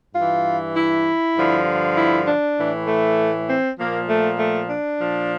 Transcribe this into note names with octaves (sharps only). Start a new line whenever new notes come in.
G2 E3 F4
E4
G2 D3 F3
E4
D4
A2 E3
A3
C4
A#2 F3 A#3
A3
A3
D4
A#2 F3